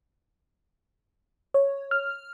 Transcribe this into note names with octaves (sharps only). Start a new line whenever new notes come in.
C#5
F6